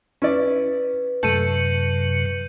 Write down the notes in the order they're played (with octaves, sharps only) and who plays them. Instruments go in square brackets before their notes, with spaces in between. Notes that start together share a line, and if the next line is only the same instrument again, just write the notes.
[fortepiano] C#4 E4 D5 [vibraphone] B4
[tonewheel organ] F#2 C3 F#3 [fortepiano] A3 A5 [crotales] G6 C#7 D#7